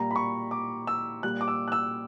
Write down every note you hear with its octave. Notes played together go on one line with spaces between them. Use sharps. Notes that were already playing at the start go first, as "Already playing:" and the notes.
Already playing: A#2 G3 A#5
B5
C#6
D6
E6
A#2 G3 F#6
D6
E6
F#6
E6